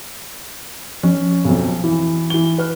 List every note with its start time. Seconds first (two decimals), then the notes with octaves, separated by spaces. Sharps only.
1.03 F3 C#4
1.45 B1 F2
1.84 E3
2.30 E3 G7
2.58 B4 F6